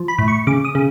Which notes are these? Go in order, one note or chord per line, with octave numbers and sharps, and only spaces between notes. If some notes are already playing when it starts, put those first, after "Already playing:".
Already playing: F3
B5
A2
C#6
C#3 D6
D#6
C#3